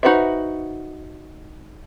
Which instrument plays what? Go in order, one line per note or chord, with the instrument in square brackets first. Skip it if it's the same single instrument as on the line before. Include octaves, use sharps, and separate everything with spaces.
[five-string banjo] D#4 F#4 B4 C5 E5